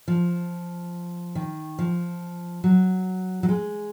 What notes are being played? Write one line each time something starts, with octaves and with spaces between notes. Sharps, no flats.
F3
D#3
F3
F#3
F#3
G#3